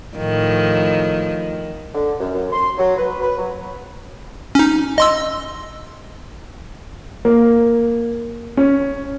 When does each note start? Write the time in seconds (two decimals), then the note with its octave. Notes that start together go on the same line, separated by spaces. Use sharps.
0.17 A2 D#3 F3
1.95 D3
2.20 F#2
2.34 F#2
2.53 C6
2.78 F#3
2.97 B4
3.22 B4
3.38 F#3
4.55 C#4 D#4
4.98 D#5 C6 E6
7.25 A#3
8.57 C#4